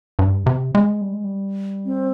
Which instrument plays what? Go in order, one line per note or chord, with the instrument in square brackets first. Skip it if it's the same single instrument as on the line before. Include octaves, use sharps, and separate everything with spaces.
[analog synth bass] G2
C3
G#3
G3
G#3
G3
[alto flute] C4